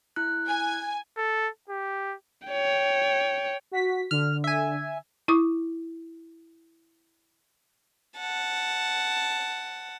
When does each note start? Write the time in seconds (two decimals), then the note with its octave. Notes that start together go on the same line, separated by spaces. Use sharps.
0.16 E4 F#6
0.48 G#5
1.17 A4
1.69 G4
2.48 C#5 G5
3.71 F#4 B6
4.11 D3 F6
4.44 E5 G#5
5.28 E4 C#6 D#6
8.19 F#5 A5